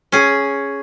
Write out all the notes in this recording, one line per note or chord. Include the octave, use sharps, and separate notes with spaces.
C#4 G#4